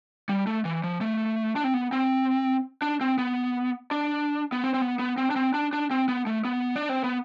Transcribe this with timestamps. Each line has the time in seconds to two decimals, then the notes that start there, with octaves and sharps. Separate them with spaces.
0.29 G3
0.47 A3
0.65 E3
0.84 F3
1.01 A3
1.56 D4
1.64 C4
1.74 B3
1.92 C4
2.82 D4
3.01 C4
3.18 B3
3.91 D4
4.52 B3
4.64 C4
4.74 C4
4.81 B3
4.99 B3
5.18 C4
5.30 D4
5.36 C4
5.54 D4
5.73 D4
5.91 C4
6.08 B3
6.27 A3
6.45 B3
6.76 D4
6.89 C4
7.04 B3